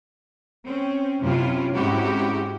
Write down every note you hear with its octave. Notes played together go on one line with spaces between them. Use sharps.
C4 C#4
F#2 C3 C#4 E4 F4
G#2 C4 C#4 E4 F#4 G4